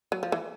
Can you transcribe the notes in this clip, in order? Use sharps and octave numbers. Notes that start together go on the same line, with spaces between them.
F#3
F3
E3